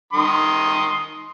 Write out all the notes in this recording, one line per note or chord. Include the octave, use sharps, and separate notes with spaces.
D#3 C6 D#6